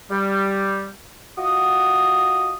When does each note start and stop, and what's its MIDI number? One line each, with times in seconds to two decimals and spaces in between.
0.11 0.87 55
1.38 2.55 65
1.38 2.55 66
1.38 2.55 75
1.38 2.55 78
1.38 2.55 87